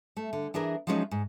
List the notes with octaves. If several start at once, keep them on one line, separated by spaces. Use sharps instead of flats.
A3
D3
E3 D4 G#4 A#4
F3 F#3 G#3 B3 C#4 D#4
G#2